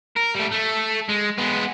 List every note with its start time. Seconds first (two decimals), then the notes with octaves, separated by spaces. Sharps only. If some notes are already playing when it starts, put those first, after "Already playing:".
0.17 A#4
0.35 G3 A3
0.52 A3
1.09 G#3
1.38 G#3 B3